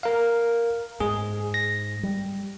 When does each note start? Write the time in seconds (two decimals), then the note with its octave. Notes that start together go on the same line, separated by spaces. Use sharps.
0.03 A#4 F5
1.00 G#2 G#4
1.54 A#6
2.03 G3